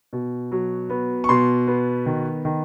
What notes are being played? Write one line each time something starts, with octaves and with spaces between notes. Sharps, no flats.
B2
F#3
B3
C#6
B2 C6
B3
D#3
D#3